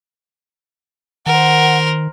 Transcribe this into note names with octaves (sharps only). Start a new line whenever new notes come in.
D#3 A#4 C5 F#5